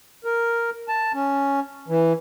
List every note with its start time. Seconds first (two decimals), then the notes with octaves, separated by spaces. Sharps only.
0.24 A#4
0.88 A5
1.14 C#4
1.88 E3